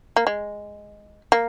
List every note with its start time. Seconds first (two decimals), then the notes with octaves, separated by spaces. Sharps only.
0.16 A#3
0.27 G#3
1.32 A#3